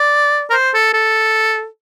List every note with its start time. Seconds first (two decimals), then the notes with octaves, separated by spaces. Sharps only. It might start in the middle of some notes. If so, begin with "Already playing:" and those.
Already playing: D5
0.50 A#4
0.53 C5
0.74 A4
0.93 A4